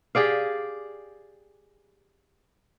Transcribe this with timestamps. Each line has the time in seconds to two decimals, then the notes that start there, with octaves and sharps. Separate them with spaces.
0.15 G4 G#4 D5 F5